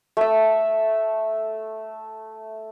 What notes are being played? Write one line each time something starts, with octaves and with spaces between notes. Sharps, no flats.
A3 E5